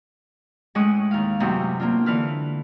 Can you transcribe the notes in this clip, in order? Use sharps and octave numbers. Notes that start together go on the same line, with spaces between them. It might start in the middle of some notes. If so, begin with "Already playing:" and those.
A2 G#3 C#4 C#6 D#6 F#6
D#2 F5
F#2 A2 C3 B3 C4 D#4
A#3 C4 D4 F4
D3 E3 B4 F6